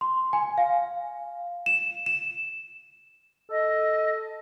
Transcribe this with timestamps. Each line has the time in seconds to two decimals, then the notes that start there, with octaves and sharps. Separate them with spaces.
0.01 C6
0.33 G#5
0.58 F5
1.66 E7
2.06 E7
3.49 A4 D#5